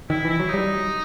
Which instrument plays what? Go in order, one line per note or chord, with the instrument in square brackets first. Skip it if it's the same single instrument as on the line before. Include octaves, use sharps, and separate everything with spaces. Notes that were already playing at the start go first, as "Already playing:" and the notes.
[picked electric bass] D#3 [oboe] E4
[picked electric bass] E3 [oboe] E4
[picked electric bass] F#3
[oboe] D#4
[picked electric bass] G3